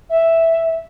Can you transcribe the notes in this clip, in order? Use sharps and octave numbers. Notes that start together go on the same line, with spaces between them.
E5